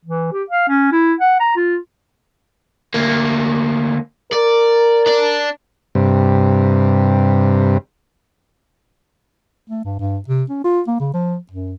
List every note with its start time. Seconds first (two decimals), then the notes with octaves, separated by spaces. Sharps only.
0.05 E3
0.32 G4
0.50 F5
0.68 C#4
0.92 E4
1.20 F#5
1.40 A#5
1.56 F4
2.94 D2 A#3
4.32 A#4 D5
5.07 D4 D5
5.95 G2 C3
9.69 A3
9.85 G2
9.99 G2
10.28 C3
10.50 C#4
10.64 F4
10.88 A#3
11.00 C#3
11.14 F3
11.52 F#2